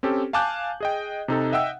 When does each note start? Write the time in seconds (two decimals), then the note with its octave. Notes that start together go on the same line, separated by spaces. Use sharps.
0.03 C4 C#4 G4 A4
0.33 F5 G#5 A5 D6 F#6 G6
0.80 G#4 D#5 G5
1.28 C3 D#4 A4
1.52 D#5 E5 F#5 G5 E6